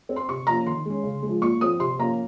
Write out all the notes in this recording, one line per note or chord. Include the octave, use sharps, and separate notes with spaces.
C4
C6
C3 C#6
F3 A#3 C#4 A#5
D#3 C6
G#3 C#4
C#3
G#3
F3
A#2 C#6
F3 C4 D#6
C3 C6
F3 A#3 C#4 A#5